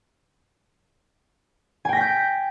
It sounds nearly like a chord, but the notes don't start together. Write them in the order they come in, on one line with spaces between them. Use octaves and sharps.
G#5 G5 A#6 B6 G6